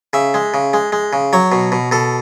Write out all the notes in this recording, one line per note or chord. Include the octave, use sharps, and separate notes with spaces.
C#3 E5
G#3
C#3
G#3
G#3
C#3
F#3 C#5
B2
B2
B2 A4